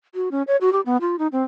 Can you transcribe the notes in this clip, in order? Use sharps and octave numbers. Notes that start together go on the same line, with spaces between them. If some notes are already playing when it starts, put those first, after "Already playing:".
F#4
C#4
C#5
F#4
G4
B3
F4
D#4
C4